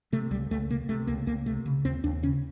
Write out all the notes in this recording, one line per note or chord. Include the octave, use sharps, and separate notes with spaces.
C3 A3
C#2 G3
C#2 A3
C3 A#3
C3 A3
C#2 A#3
C#2 A#3
C3 A3
C#3
D#2 C4
D#2 D4
C#3 C#4